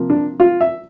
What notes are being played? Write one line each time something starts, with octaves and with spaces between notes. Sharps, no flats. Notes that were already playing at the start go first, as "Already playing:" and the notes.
Already playing: C3 F3 A#3
D4
F4
E5